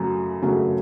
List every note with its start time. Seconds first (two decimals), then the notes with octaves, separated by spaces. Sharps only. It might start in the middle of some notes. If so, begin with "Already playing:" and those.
Already playing: F#2 C#3 F#3 A3
0.42 F#2 C#3 F#3 A3